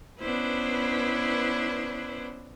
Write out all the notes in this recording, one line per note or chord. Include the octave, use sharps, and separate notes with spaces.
B3 C#4 D4 E4 B4 C5